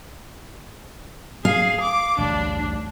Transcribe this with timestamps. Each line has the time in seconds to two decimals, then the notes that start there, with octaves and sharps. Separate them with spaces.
1.45 G#4 F5
1.81 D6
2.18 A1 D2 G2 D4